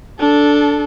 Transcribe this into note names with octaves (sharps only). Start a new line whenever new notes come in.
D4 A4